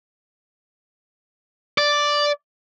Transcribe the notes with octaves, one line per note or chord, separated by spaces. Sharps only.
D5